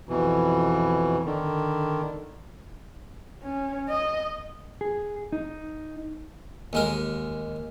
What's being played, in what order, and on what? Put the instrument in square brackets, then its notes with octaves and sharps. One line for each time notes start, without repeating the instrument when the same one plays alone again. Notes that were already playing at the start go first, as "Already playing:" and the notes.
[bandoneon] F2 B2 E3
D3 D#3
[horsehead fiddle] C#4
D#5
[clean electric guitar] G#4
D#4
[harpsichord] D#2 G#3 A#4